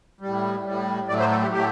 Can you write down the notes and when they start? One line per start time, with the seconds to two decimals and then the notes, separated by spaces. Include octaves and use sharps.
0.20 A2 G3
0.65 A2 G3
1.08 A2 F#3 A3 D5
1.20 C5
1.31 A4
1.42 G4
1.52 A2 F#3 A3 G4